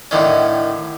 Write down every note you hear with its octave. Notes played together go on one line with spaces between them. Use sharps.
A2 D3 D#3 C#4